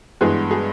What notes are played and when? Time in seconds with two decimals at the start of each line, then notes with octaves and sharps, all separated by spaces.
0.21 G2 E3 G#3 B3 D4 G#4
0.51 G#4